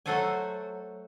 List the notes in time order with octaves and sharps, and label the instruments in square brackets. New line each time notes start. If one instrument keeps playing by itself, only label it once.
[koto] F#3 A3 F#4 A4 C5 G#5